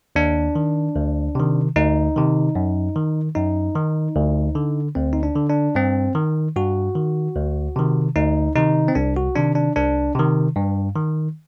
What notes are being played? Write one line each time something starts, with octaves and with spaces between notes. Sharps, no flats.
D#2 D4
D#3
D2
C3 D#3
D2 D#4
C3 D#3
F#2
D#3
F#2 D#4
D#3
D2
D3
D2 C4
D#4
D4
D3
D4
G2 C4
D#3
G2 F#4
D#3
D2
C3 D#3
D2 D#4
C3 D#3 D#4
C4
C2 D4
F#4
C3 D#3 D4
D4
C2 D4
C3 D#3
G2
D#3